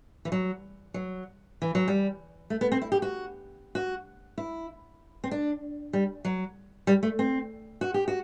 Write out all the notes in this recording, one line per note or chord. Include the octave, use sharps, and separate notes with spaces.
E3
F#3
F#3
E3
F#3
G3
A3
B3
C4
E4
G4
F#4
F#4
E4
C4
D4
G3
F#3
G3
A3
C4
F#4
G4
F#4